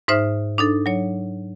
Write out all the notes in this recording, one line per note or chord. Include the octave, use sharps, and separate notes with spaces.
G#2 D#4 C5 E5 F6
D4 D#4 A4
F#3 C#5